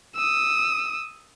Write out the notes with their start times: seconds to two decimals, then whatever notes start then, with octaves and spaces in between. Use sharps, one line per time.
0.16 D#6 E6